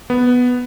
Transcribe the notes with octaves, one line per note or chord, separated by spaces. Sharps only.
B3